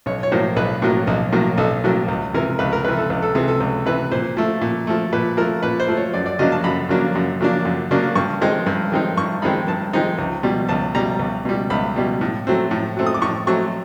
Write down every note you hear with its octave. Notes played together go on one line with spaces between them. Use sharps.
B1 C#5
C#5
A2 F#3 A#3 C5
B1 B4
A2 F#3 A#3
B1
A2 F#3 A#3
B1 A4
A2 F#3 A#3
C#2
C3 E3 A#4
C#2 B4
A#4
C3 E3 B4
A4
C#2
A4
C3 E3 G#4
A4
C#2
C3 E3 B4
A#2 C5
F3 A3
A#2
F3 A3
A#2 B4
F3 A3 A#4
A#2 B4
C5
F3 A3
C#5
F#2 D5
D5
C#3 F#3 A#3 D4 D#5
A5
F#2 B5
C#3 F#3 A#3 D4
F#2
C#3 F#3 A#3 D4
F#2
C#3 F#3 A#3 D4
G2 C#6
D#3 G#3 C4 D#4
G2
D#3 G#3 C4 D#4
G2 C#6
D#3 G#3 C4 D#4 B5
G2 A5
D#3 G#3 C4 D#4
C#2
B2 G3
C#2 A5
B2 G3 A#5
C#2
B2 G3
C#2 B5
B2 G3
A2
F#3 A3 C4
A2
F#3 A3 C4
D#6
D6
A2 C#6
F#3 A3 C4 C#6